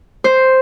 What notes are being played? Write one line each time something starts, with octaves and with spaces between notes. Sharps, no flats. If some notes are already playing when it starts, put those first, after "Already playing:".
C5